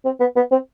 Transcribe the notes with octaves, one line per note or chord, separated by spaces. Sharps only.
C4
B3
B3
C4